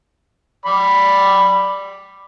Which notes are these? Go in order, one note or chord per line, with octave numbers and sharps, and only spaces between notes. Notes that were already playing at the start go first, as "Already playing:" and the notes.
D5 B5